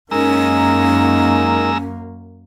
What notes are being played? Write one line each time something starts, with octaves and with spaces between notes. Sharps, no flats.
F#2 G#3 A#3 C#4 D#4 A#4 A#5 E6